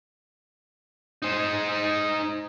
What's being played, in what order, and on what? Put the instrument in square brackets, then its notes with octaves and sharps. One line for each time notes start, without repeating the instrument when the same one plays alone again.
[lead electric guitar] D#4 C5